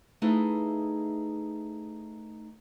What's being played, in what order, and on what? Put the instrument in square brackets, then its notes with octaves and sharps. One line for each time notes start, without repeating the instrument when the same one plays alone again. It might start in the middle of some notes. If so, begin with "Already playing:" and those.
[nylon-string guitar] A3 D#4 E4 G#4 B4 F5